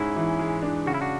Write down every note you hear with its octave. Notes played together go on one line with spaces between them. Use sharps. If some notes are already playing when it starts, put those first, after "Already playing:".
Already playing: G#2 C#4 E4 G#4
E3
G#3
D4
C#3 F#4
E4
D4 F#4